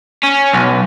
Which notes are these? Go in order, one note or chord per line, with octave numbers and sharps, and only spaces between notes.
C#4
B1